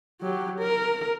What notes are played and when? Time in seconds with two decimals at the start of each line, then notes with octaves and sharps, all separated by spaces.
0.21 F#3 G4
0.59 A#4